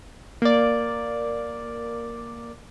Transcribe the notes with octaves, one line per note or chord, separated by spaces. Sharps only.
A#3 D5